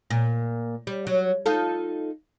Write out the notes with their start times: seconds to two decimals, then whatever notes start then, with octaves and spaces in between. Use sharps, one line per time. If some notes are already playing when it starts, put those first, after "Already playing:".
0.10 A#2
0.87 G3
1.07 F#3
1.46 D#4 F4 A4